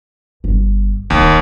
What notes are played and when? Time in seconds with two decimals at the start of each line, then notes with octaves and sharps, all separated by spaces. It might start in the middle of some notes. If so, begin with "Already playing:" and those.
0.44 G1
1.10 D1 D#2 A3